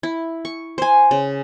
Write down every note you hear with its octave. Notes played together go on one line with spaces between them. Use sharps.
E4
C#6
C5 G#5
C#3